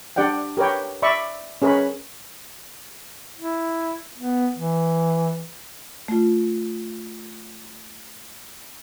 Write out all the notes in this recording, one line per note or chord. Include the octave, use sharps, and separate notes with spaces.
D4 G4 D5 F#5 G5
G4 A#4 B4 C#5 G5
D5 E5 B5 C#6
C#4 G#4 A#4 B4 C#5 B5
E4
B3
E3
A3 F4